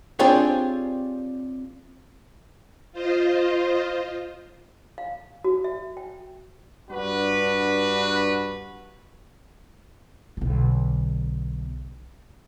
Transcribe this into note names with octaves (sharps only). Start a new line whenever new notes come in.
C4 D4 F4 G4 G#4 C#5
F4 C5 D#5
F5
F#4
E5
G5
G2 D4 F#4 B4
B1 D3